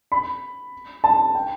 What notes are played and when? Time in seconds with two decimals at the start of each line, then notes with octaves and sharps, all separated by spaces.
0.12 B5
1.04 A5
1.35 G5